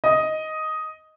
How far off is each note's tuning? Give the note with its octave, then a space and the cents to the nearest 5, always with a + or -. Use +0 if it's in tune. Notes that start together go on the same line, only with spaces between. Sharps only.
D#5 +5